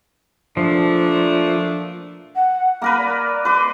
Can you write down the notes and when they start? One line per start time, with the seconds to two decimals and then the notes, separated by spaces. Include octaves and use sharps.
0.57 A#2 F3 A3 D4
2.35 F#5
2.82 A#3 A#4 B4 B5
2.98 D5
3.45 B4 C6 D6